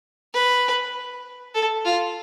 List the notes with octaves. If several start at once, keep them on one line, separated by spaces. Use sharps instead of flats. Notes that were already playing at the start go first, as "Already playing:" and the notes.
B4
A4
F4